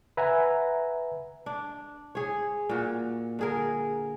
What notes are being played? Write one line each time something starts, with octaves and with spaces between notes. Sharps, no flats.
B4 E5 F#5 G#5 A#5
D4
G#4 C#5
A#2 F#4
D3 G#4 A#4